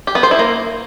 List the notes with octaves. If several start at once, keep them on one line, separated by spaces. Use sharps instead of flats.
G4
B3
C5
E4
A#3